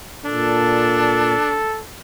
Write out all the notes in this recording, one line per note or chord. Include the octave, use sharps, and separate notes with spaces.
A#2 D4 A4